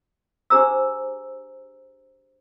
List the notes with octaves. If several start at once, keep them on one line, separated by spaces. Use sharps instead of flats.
D4 G4 G#4 C5 A#5 E6